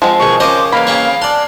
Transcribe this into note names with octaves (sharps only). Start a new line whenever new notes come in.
F3 G#3 C4
B2 D#3 G#4 C#6
C#3 A#4 C5 D#5 D6
E3 A#3 F5 B5
C#3 C4 C#5
D4 D5 C6